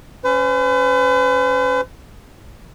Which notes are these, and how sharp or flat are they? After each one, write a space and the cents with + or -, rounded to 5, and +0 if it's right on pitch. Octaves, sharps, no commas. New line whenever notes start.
C#4 +0 B4 +45